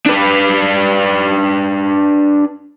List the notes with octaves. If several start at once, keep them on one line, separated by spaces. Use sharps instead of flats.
D4 B4